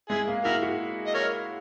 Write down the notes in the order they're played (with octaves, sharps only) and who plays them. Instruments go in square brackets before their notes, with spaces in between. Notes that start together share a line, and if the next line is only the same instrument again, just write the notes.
[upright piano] G#3 [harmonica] E4 G#4
[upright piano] A#3
[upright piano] E4 [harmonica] F#4 A#4
[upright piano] F#4
[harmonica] D#5
A#4 C#5